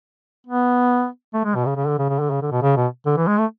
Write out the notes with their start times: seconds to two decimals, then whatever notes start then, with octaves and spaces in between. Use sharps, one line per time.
0.47 B3
1.34 A3
1.45 G#3
1.55 B2
1.66 C#3
1.76 C#3
1.87 D3
1.99 C#3
2.09 C#3
2.20 D3
2.30 C#3
2.42 D3
2.52 B2
2.62 C#3
2.77 B2
3.06 D3
3.17 E3
3.27 G#3
3.38 A3